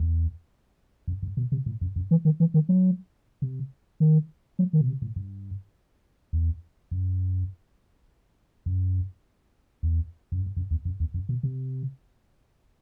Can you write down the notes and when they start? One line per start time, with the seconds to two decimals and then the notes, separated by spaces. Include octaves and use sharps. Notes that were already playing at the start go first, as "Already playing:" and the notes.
Already playing: E2
1.08 F#2
1.23 G2
1.37 B2
1.52 C3
1.66 A2
1.81 F#2
1.96 F#2
2.11 E3
2.25 D#3
2.40 E3
2.54 D#3
2.69 F#3
3.42 C3
4.00 D#3
4.59 F#3
4.73 D#3
4.81 B2
4.88 C3
5.02 A2
5.16 G2
6.33 E2
6.91 F#2
8.66 F#2
9.83 E2
10.32 F#2
10.42 G2
10.57 F#2
10.71 E2
10.85 F#2
11.00 E2
11.14 F#2
11.29 B2
11.43 C3